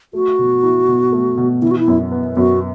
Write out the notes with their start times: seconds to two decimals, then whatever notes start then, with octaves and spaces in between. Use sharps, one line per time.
0.13 A3 F#4
0.39 B2
0.63 E4
0.88 B2
1.12 A3
1.37 B2
1.62 E3 E4
1.71 F#4
1.79 E4
1.88 F#2
2.12 B3
2.37 F#2 F#4